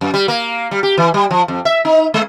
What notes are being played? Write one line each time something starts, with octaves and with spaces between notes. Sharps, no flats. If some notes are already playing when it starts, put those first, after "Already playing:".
F#2
G3
A#3
G3
G4
E3
G3
F3
F2
E5
D#4
G#3